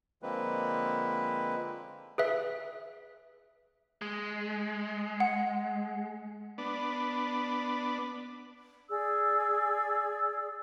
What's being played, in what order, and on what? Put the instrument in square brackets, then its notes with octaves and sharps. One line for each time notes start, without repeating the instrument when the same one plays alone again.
[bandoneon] D3 F3 G#3 A#3 C4 B4
[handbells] G#4 B4 E5
[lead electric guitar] G#3
[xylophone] F#5
[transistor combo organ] B3 D4
[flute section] G#4 D5 E6